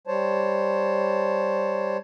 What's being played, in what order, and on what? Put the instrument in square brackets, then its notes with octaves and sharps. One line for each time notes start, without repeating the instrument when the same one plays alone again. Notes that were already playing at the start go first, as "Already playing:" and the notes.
[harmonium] G3 C5 C#5 A5